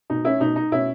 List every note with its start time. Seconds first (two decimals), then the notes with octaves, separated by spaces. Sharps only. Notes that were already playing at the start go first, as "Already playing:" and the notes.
0.10 B2 D#4
0.25 C#4 E4
0.40 B2 D#4
0.56 D#4
0.72 B2 C#4 E4